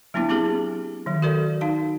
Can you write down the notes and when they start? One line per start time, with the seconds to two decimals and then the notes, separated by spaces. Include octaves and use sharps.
0.14 F#3 A#3 B3 D4 E4
0.29 B3 C4 E4 G4 G#4
1.06 D#3 F#3
1.22 F#4 A4 A#4 D5
1.61 D#4 F5 A5